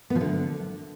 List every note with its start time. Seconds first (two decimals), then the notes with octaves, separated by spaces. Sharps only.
0.10 B3
0.15 F3
0.21 D3